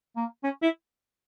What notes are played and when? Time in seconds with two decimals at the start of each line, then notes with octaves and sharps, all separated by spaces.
0.16 A#3
0.44 C#4
0.62 E4